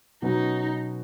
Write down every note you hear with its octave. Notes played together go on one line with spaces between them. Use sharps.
B2 F#3 C#4 D#4 F#4 B4